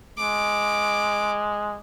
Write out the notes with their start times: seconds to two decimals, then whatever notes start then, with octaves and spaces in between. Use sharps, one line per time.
0.18 G#3 D6